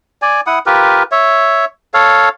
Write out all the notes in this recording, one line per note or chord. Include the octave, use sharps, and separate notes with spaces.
D5 G#5
E4 F#5 D#6
F4 G4 A#4 B4
C#5 E5
A4 C#5 F5